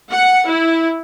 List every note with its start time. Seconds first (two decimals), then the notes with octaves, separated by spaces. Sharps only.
0.10 F#5
0.48 E4